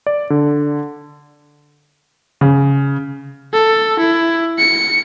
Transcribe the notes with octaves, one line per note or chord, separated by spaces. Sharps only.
D5
D3
C#3
A4
E4
C#7